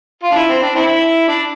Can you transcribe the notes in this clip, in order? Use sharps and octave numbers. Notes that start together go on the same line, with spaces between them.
F4
D4
E4
C4
D4
C4 E4
D4